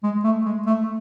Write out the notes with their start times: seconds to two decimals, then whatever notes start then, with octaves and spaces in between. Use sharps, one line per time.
0.04 G#3
0.24 A3
0.46 G#3
0.67 A3